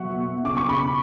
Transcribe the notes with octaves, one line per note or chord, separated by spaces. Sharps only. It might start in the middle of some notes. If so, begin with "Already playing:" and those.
Already playing: B2 F#3 B3 E5 F#5 C#6
B2
C#3 D6
C#6
C#3 B5